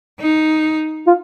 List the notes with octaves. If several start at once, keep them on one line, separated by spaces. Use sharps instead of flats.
D#4
F4